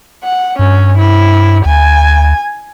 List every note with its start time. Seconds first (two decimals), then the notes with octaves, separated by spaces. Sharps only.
0.23 F#5
0.59 G2 C#4
0.98 E4
1.65 D2 G#5